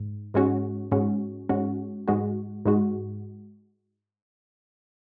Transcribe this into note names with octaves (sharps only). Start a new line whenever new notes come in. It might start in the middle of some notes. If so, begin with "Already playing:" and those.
Already playing: G#2
G#2 G#3 C#4 F#4
G#2 G#3 C#4 F#4
G#2 G#3 C#4 F#4
G#2 G#3 F#4
G#2 G#3 F#4